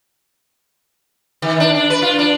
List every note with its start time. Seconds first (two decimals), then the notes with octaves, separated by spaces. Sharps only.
1.42 D#3
1.60 D4
1.75 D4
1.90 B4
2.02 F4
2.19 D4